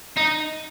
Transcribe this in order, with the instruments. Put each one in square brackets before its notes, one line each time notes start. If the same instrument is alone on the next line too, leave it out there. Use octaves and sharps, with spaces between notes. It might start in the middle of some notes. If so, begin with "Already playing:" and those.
[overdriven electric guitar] D#4